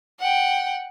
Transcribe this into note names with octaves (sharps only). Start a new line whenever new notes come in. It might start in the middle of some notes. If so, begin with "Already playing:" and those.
F#5 G5